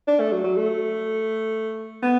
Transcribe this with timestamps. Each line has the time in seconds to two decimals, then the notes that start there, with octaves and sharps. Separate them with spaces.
0.07 D4
0.20 A3
0.32 F#3
0.44 F#3
0.57 A3
2.03 B3